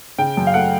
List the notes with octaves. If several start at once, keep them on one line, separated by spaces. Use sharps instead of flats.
C#3 G5
F#2
F5
A3 F#5